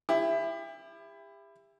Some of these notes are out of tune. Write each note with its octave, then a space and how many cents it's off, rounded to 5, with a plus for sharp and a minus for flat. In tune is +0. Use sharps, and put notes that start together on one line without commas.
E4 +15 G4 +35